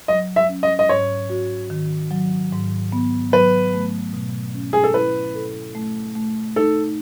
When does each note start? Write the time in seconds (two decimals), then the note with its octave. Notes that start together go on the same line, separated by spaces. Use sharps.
0.08 F#3 D#5
0.36 E5
0.49 C#4
0.63 D#5
0.79 D#5
0.89 G#2 C#5
1.30 F#4
1.70 D#3
2.11 F#3
2.52 G#2
2.92 B3
3.32 F#3 B4
3.74 A3
4.13 B2
4.54 C#4
4.73 G#4
4.84 A4
4.94 E4 B4
5.34 A4
5.75 A3
6.15 A3
6.56 D#4 A4